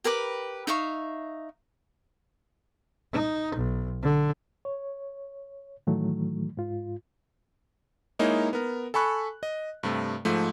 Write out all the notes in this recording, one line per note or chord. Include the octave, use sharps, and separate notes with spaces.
G4 A#4 B4 D6
D#4 E5 F5 C#6
D#4
B1
D3
C#5
A2 D#3 E3 F#3 A3
G#2 F4
G#3 A#3 D#4 E4 C#5
B3 A#4
A4 G#5 B5 C#6 F#6
D#5
G2 C3 A3
G#2 F3 A3